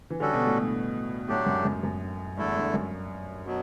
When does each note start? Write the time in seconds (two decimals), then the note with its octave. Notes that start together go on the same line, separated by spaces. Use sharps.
0.10 E3
0.20 D3 G3 C#4 F#4 A4
0.33 B2
0.47 A2
0.61 G2
1.29 A2 D3 F#3 A3 D4 G4
1.46 F#2
1.65 F#2
1.83 F#2
2.37 E2 G2 D3 A3 E4 A4
2.55 G2
2.74 F#2
3.46 B2 F#3